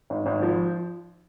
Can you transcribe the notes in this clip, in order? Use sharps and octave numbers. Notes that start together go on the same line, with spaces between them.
G#1
G#1
F3